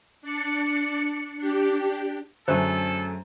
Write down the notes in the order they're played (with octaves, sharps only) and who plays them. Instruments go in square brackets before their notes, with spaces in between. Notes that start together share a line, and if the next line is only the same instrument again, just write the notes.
[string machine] D4 D5 C#7
D4 G4
[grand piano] F#2 [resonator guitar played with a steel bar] D3 A3 G#4 [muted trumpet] A4 [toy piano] C5